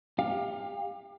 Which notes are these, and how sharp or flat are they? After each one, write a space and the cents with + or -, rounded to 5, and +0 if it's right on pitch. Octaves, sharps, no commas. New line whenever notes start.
G4 +25 F5 +15